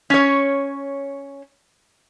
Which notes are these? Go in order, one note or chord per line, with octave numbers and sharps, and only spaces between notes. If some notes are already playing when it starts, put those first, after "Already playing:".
C#4 C#5